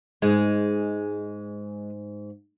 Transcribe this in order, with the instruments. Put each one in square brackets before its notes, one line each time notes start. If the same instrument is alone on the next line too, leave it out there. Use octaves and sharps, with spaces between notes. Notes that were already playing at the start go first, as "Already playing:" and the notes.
[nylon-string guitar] G#2 [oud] G#3